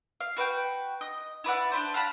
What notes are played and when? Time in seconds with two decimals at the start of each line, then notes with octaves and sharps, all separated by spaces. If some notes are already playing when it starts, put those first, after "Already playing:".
0.20 F5
0.36 F#4 B4 F5 G5
1.01 D#5
1.44 E4 B4 D5 F#5
1.72 D4 B4 C5
1.94 F5 F#5 A5 B5